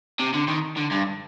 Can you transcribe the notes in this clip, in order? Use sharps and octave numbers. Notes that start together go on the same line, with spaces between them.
C3
D3
D#3
D3
G2